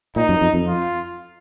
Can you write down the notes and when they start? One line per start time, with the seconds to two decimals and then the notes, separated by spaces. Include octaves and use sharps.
0.16 A#2 D#4
0.29 F#2
0.41 F2
0.54 F2
0.67 F4